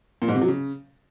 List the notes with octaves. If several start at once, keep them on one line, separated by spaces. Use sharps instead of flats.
A#2
G#2
C3
F#3
C#3